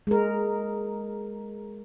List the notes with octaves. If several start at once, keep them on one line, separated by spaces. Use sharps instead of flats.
G#3 A#4